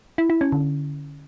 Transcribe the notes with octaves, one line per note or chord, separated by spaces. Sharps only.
E4
E4
C#4
D3